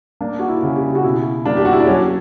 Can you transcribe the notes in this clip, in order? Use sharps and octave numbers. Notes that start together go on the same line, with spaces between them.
A#3 D4
F#4
E4
C#3
G4
F#4
B2 E4
A#3 D4
G4
F#4
E4
D4
F#3 C#4